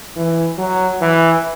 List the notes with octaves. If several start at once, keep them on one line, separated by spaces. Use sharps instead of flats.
E3
F#3
E3